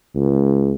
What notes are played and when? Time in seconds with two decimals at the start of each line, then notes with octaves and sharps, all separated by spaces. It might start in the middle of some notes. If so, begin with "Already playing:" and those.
0.15 C#2